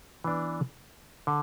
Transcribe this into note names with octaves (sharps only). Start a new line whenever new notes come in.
E3 B3 D4
D3